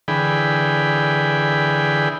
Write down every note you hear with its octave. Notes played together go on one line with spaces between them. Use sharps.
D3 E3 G#4 G5 B5